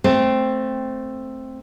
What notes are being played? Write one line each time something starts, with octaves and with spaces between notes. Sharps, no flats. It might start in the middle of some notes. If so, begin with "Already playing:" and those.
A3 C4